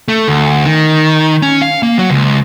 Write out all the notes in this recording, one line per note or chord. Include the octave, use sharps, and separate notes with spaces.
A3
D2
D#3
C#4
F5
A#3
F#3
C#2